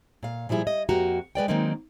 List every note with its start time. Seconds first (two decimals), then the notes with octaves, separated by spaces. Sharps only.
0.23 A#2 F5
0.49 A#2 F3 G3 E4 G#4
0.67 D#5
0.89 F2 A#3 F#4 G4 A#5
1.35 G#3 B4 D5 G5
1.48 D#3 F#3 G#3 A#3 C4 D#4